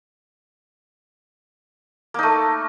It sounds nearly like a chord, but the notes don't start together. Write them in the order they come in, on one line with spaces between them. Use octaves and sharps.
A#3 D#4 A3